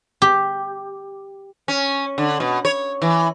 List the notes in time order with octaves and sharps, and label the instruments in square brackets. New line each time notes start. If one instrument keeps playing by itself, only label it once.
[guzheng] G4
[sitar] C#4
D3
B2
C#5
E3